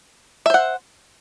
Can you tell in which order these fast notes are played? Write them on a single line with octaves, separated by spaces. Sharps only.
E5 C5 F#5